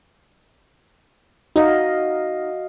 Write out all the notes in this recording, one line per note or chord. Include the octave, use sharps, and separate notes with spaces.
D#4 F#4 D#5 F5